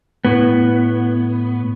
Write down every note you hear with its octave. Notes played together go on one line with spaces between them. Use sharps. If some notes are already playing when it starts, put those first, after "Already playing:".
A2 B3